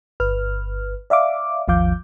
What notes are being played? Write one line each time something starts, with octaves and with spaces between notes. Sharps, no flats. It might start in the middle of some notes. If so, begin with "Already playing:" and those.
G1 B4 F6
D5 E5 F5 D6
G#1 D#2 F3 F5 D6 G6